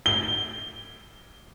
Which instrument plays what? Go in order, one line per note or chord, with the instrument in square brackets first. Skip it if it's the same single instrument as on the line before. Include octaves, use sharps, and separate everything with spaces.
[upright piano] G7